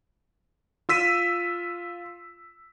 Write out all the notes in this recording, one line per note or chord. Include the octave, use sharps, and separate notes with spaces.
F4 E6 B6 D#7